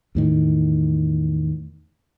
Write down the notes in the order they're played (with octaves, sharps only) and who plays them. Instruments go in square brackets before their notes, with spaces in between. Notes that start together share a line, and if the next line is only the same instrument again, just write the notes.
[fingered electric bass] E2 A2 D#3